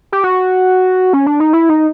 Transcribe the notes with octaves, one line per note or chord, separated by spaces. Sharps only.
G4
F#4
C#4
D4
D#4
E4
D#4